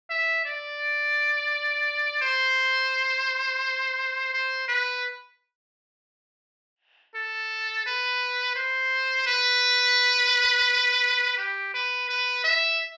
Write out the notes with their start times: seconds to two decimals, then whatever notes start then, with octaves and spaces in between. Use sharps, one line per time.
0.10 E5
0.45 D5
2.22 C5
4.34 C5
4.68 B4
7.15 A4
7.86 B4
8.56 C5
9.27 B4
11.38 G4
11.74 B4
12.09 B4
12.44 E5